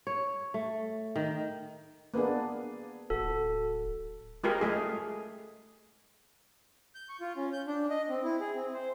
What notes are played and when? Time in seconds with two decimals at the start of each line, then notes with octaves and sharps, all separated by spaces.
0.07 C#5
0.54 A3
1.16 D#3
2.14 A#3 B3 D4 G#4 B4
3.10 D1 F#4 A4
4.44 G#3 F4 G4 G#4 A#4
4.61 G#3 A3 G#4
6.95 G6
7.09 C#6
7.21 F4
7.37 C#4
7.53 G6
7.67 D4
7.90 D#5
8.09 C4
8.23 E4
8.40 G#4
8.54 C4
8.73 C5